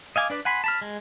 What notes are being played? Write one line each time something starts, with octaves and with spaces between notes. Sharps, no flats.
D#5 F5 G#5 D6
D4 B4 D5
F#5 G#5 B5 C6
A5 B5 F6
G#3